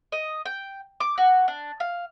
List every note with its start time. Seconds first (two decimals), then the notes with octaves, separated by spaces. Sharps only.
0.12 D#5
0.46 G5
1.00 D6
1.18 F#4
1.48 D4
1.80 F5